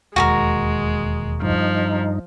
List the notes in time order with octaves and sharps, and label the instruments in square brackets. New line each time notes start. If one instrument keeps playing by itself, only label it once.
[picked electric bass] E1 D#2 [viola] G#3 [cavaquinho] F#4 G#4 A#4
[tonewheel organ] G2 D#4 [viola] F3